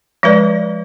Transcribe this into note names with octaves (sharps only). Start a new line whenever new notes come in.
F3 G#3 B4 D5